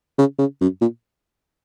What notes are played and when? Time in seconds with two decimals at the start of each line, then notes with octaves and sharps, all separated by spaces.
0.18 C#3
0.39 C#3
0.61 F#2
0.81 A#2